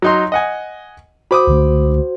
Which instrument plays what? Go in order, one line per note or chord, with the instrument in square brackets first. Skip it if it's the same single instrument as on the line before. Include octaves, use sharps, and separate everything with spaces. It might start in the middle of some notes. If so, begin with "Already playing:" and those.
[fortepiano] F#3 D#4 C6
D#5 F#5 G#5
[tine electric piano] F#4 C5 [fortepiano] B5 D6 D#6
[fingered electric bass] C#2 D3 A3